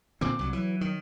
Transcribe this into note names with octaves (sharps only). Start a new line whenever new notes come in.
A#2 D3 C4 D6
C2 F#3
E3 F#3
D#3